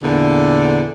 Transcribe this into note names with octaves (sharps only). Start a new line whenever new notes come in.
E2 A#2 D3